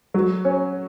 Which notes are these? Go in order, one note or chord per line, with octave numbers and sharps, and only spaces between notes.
F#3
C#4